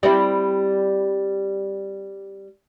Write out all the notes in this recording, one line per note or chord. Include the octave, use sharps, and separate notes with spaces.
G3 C4 E4